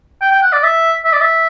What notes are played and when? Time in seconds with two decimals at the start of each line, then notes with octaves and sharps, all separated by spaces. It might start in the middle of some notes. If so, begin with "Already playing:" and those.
0.22 G5
0.32 G5
0.43 F#5
0.53 D5
0.63 E5
1.05 E5
1.13 D5
1.21 E5